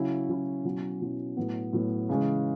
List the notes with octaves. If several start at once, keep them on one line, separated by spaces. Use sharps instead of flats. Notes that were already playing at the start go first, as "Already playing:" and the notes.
Already playing: C#3 F#3 C#4 E4
C#3 F#3 C#4 E4
B2 F#3 C#4 E4
B2 F#3 C#4 E4
A2 F#3 B3
A2 F#3 B3
C#3 E3 G#3 C#4